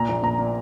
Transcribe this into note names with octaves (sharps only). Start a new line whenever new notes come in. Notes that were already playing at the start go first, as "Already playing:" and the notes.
Already playing: A#2 A#5
A#1
A#2 A#5
A#2